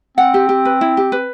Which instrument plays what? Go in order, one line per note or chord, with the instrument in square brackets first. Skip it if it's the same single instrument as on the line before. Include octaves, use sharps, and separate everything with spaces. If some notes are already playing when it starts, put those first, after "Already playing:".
[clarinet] C4 [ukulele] F#5
[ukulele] G4
G4
B4
E4
G4
B4